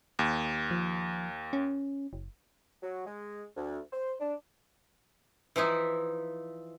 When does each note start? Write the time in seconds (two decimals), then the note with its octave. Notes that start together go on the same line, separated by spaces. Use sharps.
0.19 D#2
0.71 F3
1.53 C#4
2.13 F#1
2.82 F#3
3.05 G#3
3.56 D2
3.93 C5
4.20 D4
5.56 E3 F3 D#4 E4